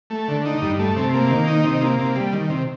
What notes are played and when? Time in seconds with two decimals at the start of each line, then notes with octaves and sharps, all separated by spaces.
0.10 A3
0.28 D3
0.45 D#4
0.62 G2
0.79 A3
0.96 C3
1.14 A#3
1.31 D#3
1.48 D#4
1.64 C3
1.82 A#3
1.99 C3
2.16 G3
2.33 D#3
2.50 C3